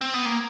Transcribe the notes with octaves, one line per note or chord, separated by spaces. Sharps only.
C4
B3
A#3